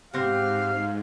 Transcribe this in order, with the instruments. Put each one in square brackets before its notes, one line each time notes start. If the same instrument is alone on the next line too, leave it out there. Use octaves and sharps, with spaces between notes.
[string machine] G#2 [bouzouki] C4 F#5 [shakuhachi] G4 [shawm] F5